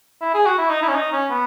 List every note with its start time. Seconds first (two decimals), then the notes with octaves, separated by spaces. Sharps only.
0.21 E4
0.34 G#4
0.46 F#4
0.58 E4
0.70 D#4
0.82 E4
0.88 C#4
0.95 D#4
1.12 C#4
1.30 B3